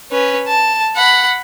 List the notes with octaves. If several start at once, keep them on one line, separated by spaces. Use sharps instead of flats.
C#4 B4
A5
F#5 B5